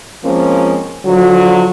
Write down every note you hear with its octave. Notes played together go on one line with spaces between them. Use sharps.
F3 G#3 A#3 C4 C#4
D3 F3 F#3